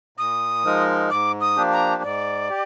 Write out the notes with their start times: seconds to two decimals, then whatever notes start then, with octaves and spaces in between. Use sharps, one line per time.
0.17 A#2 D#6
0.64 F3 G#3 D#4 A#4
1.10 G#2 D6
1.41 D#6
1.56 F3 A#3 D4 G4
1.72 A#5
2.03 G#2 D5
2.49 G4